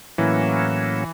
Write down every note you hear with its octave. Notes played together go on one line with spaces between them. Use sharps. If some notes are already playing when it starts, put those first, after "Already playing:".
A2 E3 F#3 A#3 C#4 E4